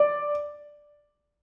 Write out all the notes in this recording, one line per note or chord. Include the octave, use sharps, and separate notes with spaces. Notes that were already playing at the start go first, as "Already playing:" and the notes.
Already playing: D5